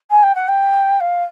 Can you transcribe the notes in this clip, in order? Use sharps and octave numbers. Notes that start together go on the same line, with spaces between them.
G#5
G5
F#5
G5
F5